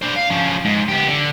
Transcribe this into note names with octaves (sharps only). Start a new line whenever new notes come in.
D4 C5
F5
F3 C#4
G#2
B3 G4
D3